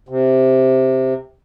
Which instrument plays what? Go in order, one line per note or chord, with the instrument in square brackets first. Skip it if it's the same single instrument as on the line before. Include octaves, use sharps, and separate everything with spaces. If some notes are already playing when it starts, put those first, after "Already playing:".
[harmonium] C3